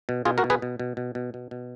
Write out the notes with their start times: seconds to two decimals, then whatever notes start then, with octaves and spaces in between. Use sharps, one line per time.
0.09 B2
0.25 B2 F4 G#4
0.38 F#4 A#4
0.44 B2
0.50 G#4 B4
0.62 B2
0.80 B2
0.97 B2
1.15 B2
1.34 B2
1.51 B2